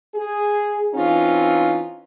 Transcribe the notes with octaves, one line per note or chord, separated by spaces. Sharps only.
G#4
E3 C4 C#4 D#4 F4